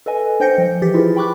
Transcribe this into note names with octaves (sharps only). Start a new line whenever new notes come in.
A4 B4 D#5 G#5
D4 C5 G5 G6 A#6 C#7
F3
E3 G4 A6 B6
E4 F4 G#4 B4
G5 B5 C#6 D6 F#6